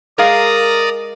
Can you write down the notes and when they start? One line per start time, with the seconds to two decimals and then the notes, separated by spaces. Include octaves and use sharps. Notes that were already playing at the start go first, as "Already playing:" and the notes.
0.18 G#3 G#4 A#4 D5 F5 A#5 D#6